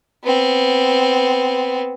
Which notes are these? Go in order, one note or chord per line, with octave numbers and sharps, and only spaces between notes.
B3 C4